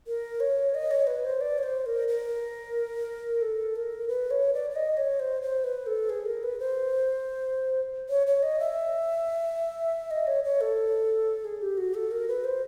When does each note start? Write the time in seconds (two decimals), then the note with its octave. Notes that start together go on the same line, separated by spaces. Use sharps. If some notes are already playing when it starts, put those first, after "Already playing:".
0.07 A#4
0.40 C#5
0.74 D#5
0.91 C#5
1.07 B4
1.24 C5
1.41 D5
1.58 C#5
1.63 C5
1.86 A#4
2.08 A#4
3.41 A4
3.76 A#4
4.08 B4
4.31 C#5
4.54 D5
4.70 D5
4.76 D#5
4.97 C#5
5.20 C5
5.42 C5
5.64 B4
5.87 A4
6.10 G#4
6.26 A#4
6.43 B4
6.60 C5
8.09 C#5
8.27 C#5
8.43 D#5
8.59 E5
10.11 D#5
10.27 C#5
10.44 C#5
10.61 A4
11.45 G#4
11.62 G4
11.78 F#4
11.94 A4
12.11 A#4
12.28 B4
12.44 C5